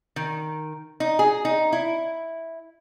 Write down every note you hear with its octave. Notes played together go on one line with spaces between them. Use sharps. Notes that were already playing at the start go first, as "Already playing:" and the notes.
D#3
D#4
G#4
D#4
E4